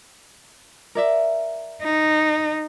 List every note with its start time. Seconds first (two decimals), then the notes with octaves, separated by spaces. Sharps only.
0.95 A#4 D5 E5
1.82 D#4